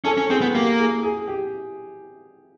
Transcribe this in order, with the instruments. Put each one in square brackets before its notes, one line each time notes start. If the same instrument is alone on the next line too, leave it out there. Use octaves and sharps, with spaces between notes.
[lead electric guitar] C#4 [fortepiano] A4
[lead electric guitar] C#4
[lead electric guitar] C4 [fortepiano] G#4
[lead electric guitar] B3
[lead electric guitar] A#3 [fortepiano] G4
[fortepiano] G#4
G#4
G4